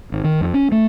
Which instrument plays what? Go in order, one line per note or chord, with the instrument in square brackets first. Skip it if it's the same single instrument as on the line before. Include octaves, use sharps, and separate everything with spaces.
[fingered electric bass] G#1
D#3
F2
C#4
A3